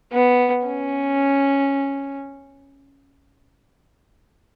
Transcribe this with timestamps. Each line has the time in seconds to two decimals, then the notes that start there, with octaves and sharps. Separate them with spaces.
0.13 B3
0.67 C#4